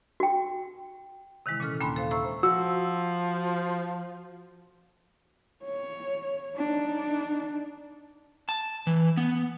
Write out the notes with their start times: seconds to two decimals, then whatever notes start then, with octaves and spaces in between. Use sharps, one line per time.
0.20 F#4 G5
1.46 C3 D#3 E3 G#3 E4
1.60 A#2 C#4 A4 F6
1.80 D#2 A#3 D4 G#5 B5 C6
1.96 A4 C5 F5
2.11 A4 C5 E5 A#5 C#6 E6
2.43 F3 F#4 E6
5.65 C#5
6.56 D4 D#4
8.49 A5
8.87 E3
9.17 B3